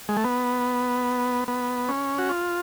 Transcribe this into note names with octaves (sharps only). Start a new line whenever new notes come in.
G#3
A3
B3
B3
C#4
F#4
F4